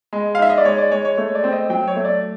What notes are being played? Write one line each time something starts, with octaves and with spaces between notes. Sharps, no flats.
G#3
F5
D#4 E5
D#5
D5
G#3 C#5
D5
G#3 C#5
C#5
A3 C#5
D5
C4
D#5
F#3 G5
C#5
A3
D5